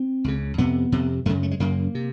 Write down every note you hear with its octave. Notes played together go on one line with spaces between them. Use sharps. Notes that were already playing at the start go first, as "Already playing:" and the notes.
Already playing: C4
C#2 C#3
F2 C3 B3
F2 C3
F#2 C#3 A3
A3
G#3
F#2 C#3 A#3
C3